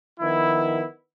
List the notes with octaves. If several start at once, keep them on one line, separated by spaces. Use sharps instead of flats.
D#3 F3 B3 E4